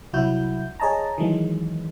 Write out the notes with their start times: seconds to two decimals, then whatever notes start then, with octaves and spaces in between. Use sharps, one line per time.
0.13 C2 F#3 E4 F#4 G6
0.80 G#4 C#5 D#5 A5 A#5
1.18 D#3 E3 F#3 G#3